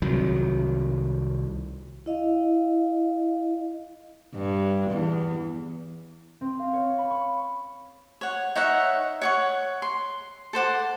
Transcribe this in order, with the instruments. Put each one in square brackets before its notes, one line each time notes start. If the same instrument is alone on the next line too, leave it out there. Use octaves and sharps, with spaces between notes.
[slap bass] C2 D#3 F#3
[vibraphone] E4 D#5 F5
[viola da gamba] G2
E2
[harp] C4
F5
C#5
B5
C#6
[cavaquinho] C#5 F#5
D#4 C#5 E5 F#5
C#5 F#5 C#6
C6
A4 C5 F#5 D6